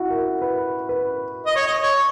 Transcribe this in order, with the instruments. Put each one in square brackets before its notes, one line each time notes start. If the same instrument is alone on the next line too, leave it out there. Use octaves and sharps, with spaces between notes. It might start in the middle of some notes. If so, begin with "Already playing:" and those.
Already playing: [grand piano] E4 F#4
A#4
B4
B4
[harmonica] D#5
C#5
D#5
C#5